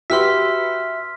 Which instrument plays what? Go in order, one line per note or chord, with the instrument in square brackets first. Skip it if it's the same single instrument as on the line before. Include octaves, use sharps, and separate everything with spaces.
[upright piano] F#4 G4 B4 [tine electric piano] E5 [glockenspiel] C6 F6 B6